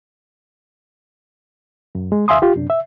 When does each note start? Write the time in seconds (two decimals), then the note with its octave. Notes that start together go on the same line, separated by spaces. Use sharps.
1.95 F#2
2.12 G#3
2.28 D#2 E5 F5 G#5 C6 D#6
2.42 F4 G4
2.56 F#2 C3 D4
2.70 E5